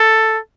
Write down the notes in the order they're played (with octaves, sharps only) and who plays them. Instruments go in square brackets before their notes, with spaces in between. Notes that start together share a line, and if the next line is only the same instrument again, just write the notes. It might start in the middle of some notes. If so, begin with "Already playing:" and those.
Already playing: [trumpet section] A4